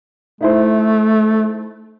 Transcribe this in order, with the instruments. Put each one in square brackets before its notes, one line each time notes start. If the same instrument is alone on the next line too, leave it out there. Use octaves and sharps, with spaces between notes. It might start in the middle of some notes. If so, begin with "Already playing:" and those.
[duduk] A3 [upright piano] D#4 E4 C5